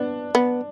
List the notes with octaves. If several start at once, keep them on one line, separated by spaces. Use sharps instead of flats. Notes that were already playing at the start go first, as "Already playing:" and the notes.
Already playing: B3 D4
B3